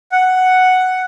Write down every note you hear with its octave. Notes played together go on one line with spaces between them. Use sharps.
F#5